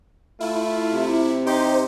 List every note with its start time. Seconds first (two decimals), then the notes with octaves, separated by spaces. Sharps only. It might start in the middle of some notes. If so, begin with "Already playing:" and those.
0.40 A3 E4 F4
0.91 C3
1.47 D#4 G4 C5